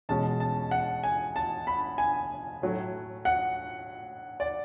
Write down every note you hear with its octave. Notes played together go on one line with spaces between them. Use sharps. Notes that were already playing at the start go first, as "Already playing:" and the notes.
E2 B2 G#3 C#4 A5
A5
F#5
G#5
A5
B5
G#5
A2 F#3 A3
F#5
D5